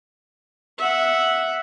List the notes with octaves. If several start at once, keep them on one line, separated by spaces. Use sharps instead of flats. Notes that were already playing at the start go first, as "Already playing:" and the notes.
E5 F#5